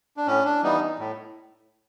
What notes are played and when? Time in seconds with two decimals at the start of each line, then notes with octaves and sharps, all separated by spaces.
0.17 D4
0.27 A2 C#4
0.45 D4
0.63 E3 G3 B3 D#4
0.99 A2